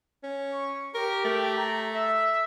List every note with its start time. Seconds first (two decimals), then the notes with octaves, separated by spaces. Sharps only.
0.23 C#4
0.52 C#6
0.94 G4 A#4
1.25 A3
1.58 A#5
1.94 E5